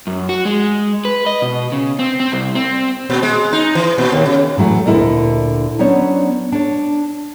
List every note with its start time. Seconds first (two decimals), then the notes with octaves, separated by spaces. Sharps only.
0.07 F#2
0.29 F#4
0.45 G#3
1.05 B4
1.26 D#5
1.42 B2
1.72 C#3
1.99 C4
2.20 C4
2.32 C2
2.55 C4
3.10 A#2
3.23 G#3
3.53 D#4
3.75 E3
3.98 A#2
4.12 D#2
4.26 C#3
4.57 A2 E3 F#3 A3
4.86 D2 A#2 D3 E4 A#4 D#5
5.79 F#3 B3 C#4 D4 C5 C#5
6.52 D4 C#5